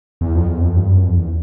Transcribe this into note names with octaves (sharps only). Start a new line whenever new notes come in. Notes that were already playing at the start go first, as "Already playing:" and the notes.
E2
F2
E2
F2
G2
F#2
F2
E2